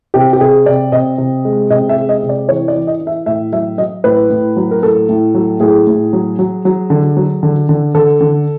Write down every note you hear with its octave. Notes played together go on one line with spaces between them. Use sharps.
C3 G4
G4
C3 G#4
C3 D5
C3 D#5
C3
G#3
C3 D#5
E5
G#3
D#5
C3
D5
E3 C#5
D5
E3
D#5
E3
E5
A2 E5
F#3 E5
F#3 D#5
A2 B4
A2
F#3
A#4
A2 A4
A2
F#3
A2 G#4
A2
F#3
F#3
F#3
D3
F#3
D3
D3
D3 A4
D3